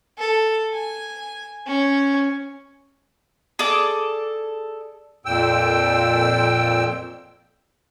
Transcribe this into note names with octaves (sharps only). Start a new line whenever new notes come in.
A4
G#5
C#4
G#4 A4 D5 D6
F2 A#2 G5 E6